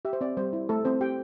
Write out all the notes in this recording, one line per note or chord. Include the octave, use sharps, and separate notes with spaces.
G4 E5
C5
C4 D5
G3 C5
E4
A3 A4
C4 C5
G4 G5